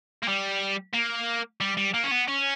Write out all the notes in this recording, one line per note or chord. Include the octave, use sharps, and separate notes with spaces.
A#3
G3
A#3
G3
G3
A#3
C#4
B3
C#4